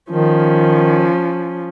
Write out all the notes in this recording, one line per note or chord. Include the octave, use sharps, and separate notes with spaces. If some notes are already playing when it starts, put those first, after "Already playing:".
D#3 F3 C#4